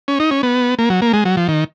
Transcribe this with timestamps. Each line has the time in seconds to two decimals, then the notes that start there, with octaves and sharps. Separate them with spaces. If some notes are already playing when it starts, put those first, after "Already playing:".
0.08 C#4
0.20 D#4
0.31 C#4
0.43 B3
0.79 A#3
0.90 F#3
1.02 A#3
1.13 G#3
1.25 F#3
1.37 F3
1.48 D#3